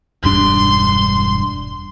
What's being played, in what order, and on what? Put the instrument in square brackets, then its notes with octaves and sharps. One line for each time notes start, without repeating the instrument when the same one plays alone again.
[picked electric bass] E1 G2 D4 [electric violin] C6